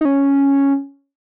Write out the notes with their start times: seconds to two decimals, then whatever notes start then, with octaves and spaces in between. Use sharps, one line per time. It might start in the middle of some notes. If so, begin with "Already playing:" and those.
0.01 D#4
0.05 C#4